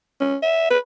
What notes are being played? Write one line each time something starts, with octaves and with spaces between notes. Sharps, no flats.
C#4
E5
B4